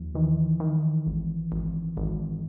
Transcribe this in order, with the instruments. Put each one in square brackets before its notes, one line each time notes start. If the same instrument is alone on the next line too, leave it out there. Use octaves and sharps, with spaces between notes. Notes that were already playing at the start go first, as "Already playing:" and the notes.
Already playing: [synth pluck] D#2 [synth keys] F3
[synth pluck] D#3 [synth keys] E3
[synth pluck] D#3
G#1
G#1
G#1